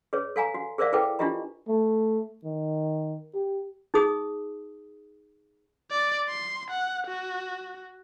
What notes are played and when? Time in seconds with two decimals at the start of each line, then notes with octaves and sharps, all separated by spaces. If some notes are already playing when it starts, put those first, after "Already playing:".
0.13 G#4 B4 C#5
0.36 A4 F5 G#5 A#5
0.54 F#4
0.78 G#4 A#4 C5 D5 E5 F5
0.92 E4 G#4 A4 B4 G5 D6
1.19 D4 E4 F4 G4 D#5 A#5
1.68 A3
2.44 D#3
3.34 G4
3.94 D#4 G#4 D#6
5.91 D5
6.29 C6
6.70 F#5
7.07 F#4